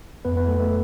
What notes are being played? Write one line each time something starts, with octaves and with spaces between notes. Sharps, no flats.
F2 B3 B4
B3 B4
A3 B3 A4
A3 A4